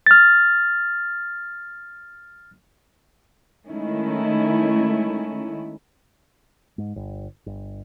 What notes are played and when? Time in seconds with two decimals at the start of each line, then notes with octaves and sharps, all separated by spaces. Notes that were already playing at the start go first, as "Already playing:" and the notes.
0.06 F6 A6
3.68 D#3 G#3 A3 C#4 E4
6.78 G#2
6.96 G1
7.46 G1